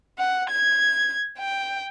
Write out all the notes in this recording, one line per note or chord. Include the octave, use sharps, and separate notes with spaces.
F#5
G#6
G5